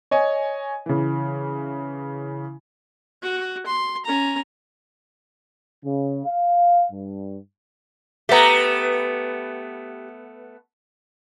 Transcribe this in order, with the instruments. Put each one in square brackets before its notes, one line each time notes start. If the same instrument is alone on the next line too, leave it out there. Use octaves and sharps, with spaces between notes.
[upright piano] C#5 D#5 G#5
C#3 E3
[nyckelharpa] F#4
C6
C#4 A#5
[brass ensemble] C#3
F5
G2
[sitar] A3 B3 [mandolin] G4 A#5